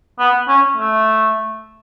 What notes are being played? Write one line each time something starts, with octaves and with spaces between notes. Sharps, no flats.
B3
C#4
A3